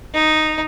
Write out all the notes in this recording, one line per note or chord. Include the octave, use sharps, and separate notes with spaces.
D#4